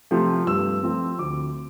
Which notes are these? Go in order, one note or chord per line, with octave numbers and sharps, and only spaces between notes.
C3 F3 A3
G2 E6
F3 A3 C4
D2 D6